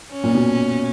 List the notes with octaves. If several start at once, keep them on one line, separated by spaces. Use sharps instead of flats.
C#4
A#2
B2